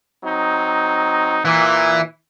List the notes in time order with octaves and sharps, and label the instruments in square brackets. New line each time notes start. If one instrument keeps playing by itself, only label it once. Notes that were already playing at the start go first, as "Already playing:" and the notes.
[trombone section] F#3 C4 D#4
[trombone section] A#2 [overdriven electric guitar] E3